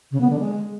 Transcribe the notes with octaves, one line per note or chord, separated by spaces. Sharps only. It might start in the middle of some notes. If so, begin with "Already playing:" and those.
C#3
B3
D3
G#3